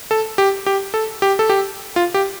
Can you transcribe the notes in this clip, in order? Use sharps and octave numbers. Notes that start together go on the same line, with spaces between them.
A4
G4
G4
A4
G4
A4
G4
F4
G4